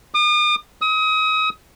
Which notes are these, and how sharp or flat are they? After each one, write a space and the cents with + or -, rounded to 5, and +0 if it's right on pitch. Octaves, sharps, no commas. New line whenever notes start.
D#6 -45
D#6 +35